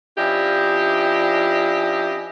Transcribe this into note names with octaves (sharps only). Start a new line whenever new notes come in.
F3 C#4 D4 E4 G4 D#5